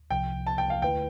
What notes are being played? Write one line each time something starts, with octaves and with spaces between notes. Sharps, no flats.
C2 C3 F3 G5
A5
G5
F5
D2 D3 A3 E4 B4 G5